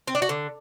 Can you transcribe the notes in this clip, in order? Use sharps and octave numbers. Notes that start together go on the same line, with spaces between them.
C4
D4
F#4
D3